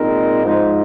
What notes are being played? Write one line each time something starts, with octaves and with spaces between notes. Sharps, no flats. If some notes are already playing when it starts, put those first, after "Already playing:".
Already playing: A#2 G#3 C4 D#4 A#4
G#2 F3 G#3 D#4